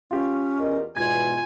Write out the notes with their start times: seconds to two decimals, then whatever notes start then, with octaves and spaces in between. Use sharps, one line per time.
0.11 C#4 F4 G4
0.59 E2 A#4 D#5
0.97 E2 G#2 B2 F4 G#5 G#6